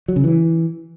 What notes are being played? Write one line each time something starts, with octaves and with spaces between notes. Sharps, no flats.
F#3
C#3
E3